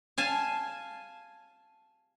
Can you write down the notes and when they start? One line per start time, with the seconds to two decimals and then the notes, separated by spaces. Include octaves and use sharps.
0.18 F5 G#5 A5